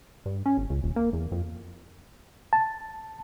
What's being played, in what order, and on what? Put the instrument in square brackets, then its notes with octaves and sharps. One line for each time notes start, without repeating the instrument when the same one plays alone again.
[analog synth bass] G2
C#4
G1
C#2
D#1
A#3
E2
F2
[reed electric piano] A5